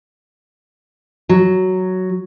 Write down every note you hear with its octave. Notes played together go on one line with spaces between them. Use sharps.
F#3